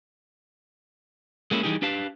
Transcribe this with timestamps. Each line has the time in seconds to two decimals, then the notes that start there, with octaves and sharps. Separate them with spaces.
1.51 G#3 A#3 C#4 E4
1.63 E3 G3 D#4 G4 G#4
1.82 D4 G4 B4 F5 A5